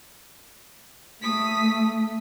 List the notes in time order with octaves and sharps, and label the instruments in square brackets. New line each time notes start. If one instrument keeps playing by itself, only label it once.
[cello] A3 [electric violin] D#6 B6